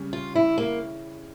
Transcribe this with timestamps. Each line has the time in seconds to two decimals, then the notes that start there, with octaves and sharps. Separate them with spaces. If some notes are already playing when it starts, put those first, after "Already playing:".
Already playing: C#3 G3 C#4
0.13 F4
0.36 E4
0.58 A#3